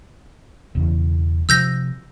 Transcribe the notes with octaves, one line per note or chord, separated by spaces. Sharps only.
E1 E2 C#3
C3 F3 E6 G6 A#6